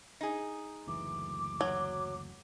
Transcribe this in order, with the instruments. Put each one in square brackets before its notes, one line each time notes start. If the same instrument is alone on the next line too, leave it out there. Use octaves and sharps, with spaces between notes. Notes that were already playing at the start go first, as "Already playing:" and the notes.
[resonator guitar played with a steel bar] D#4 G#4
[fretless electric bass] F#1 D2 E3 [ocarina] D6
[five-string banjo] F#3